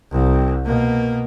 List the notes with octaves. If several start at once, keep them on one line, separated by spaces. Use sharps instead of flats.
C2
B2 A#3